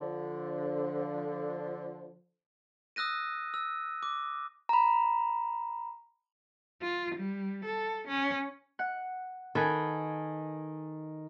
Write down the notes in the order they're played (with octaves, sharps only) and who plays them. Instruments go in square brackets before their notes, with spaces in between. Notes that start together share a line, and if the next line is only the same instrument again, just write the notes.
[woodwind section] D3 F3
[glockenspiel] D#6 E6 F#6 A#6 D#7
E6
D6
[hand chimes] A#5 B5
[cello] F4
G3
A4
C#4
[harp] F#5
[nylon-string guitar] D#3 [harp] A4 B4 G#5